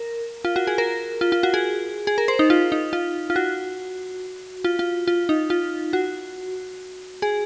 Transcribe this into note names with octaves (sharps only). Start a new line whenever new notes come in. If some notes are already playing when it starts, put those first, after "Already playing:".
Already playing: A#4
F4
F#4
G#4
A#4
F4
F4
F#4
G#4
G#4
A#4
C5
D#4
F4
D#4
F4
F4
F#4
F4
F4
F4
D#4
F4
F#4
G#4